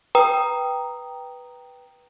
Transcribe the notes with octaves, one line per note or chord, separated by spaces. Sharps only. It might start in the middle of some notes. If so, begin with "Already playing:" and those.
B4 G5 A#5 D#6